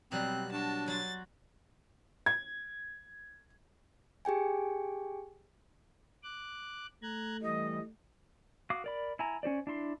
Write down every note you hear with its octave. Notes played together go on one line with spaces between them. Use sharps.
B2 F#3 G3 C4 F#6
D4 F#4 A5
F#3 F#4 C6 A6
G#6
G4 G#4 G5 G#5
D6 F#6
A3 A#5 F#6 G#6
E3 G3 D#5
F#4 F5 D6 D#6
A#4 D5 B5
E4 G#5 A#5
C#4 F#4 C5 D5
D4 E4 C6